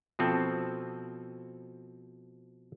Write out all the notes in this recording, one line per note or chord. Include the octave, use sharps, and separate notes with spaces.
B2 F3 C4 A4